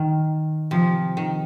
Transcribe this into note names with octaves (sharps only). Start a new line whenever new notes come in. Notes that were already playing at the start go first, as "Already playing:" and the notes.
Already playing: D#3
C3 F3
D#3